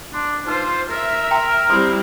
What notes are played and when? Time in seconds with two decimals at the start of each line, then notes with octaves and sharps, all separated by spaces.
0.14 D4 C6
0.47 D#4 F4 B4 C5
0.90 A#4 E5
1.31 G5 A#5 C6
1.70 G3 C4 E4 C5 C6 D#6